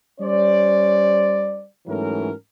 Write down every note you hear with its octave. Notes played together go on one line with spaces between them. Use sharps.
G3 C#4 C5 D5
G#2 E3 F#3 A3 C#4 A#4